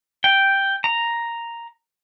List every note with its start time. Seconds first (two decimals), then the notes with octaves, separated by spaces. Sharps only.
0.24 G5
0.84 A#5